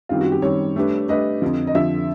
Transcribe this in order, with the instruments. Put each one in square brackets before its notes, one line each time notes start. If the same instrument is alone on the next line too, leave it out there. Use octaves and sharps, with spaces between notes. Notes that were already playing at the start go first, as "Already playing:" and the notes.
[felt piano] F#2 D#3 G3 C4 [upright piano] F4
[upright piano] F#4
G4
[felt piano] F#2 D#3 G3 C4 [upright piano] C#5
[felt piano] A3 D4 G4 B4
[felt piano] A3 D4 G4 B4 [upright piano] D#5
[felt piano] F2 D3 F3
[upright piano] D#5
[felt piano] F2 D3 F3 [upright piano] E5